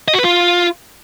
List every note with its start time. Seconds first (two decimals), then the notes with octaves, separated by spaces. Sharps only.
0.08 D#5
0.13 F#4
0.19 B4
0.24 F4